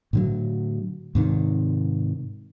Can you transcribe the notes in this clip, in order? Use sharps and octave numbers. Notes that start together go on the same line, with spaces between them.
A2 D3 F#3
G#2 C3 D#3